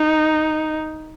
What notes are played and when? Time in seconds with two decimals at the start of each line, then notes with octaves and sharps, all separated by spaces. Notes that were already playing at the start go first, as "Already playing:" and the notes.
Already playing: D#4